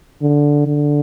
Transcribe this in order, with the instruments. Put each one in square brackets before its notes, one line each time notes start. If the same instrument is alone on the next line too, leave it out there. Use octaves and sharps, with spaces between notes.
[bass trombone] D3
D3